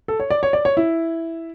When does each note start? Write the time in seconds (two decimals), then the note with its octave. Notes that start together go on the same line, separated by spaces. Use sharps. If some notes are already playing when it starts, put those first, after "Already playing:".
0.08 A4
0.20 C#5
0.30 D5
0.43 C#5
0.53 D5
0.65 C#5
0.77 E4